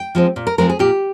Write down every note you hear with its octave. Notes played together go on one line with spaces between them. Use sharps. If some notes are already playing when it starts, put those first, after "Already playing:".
Already playing: G5
F3 G#3 C4
A#2
A#4
F3 G#3 C4 A#4
G#4
A#2 G4